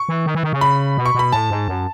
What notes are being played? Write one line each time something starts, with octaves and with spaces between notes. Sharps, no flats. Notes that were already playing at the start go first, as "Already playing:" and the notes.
Already playing: C#6
E3
D#3
E3
D#3
C#3
B5
B2
C#6
B2 B5
A2 A5
G#2
F#2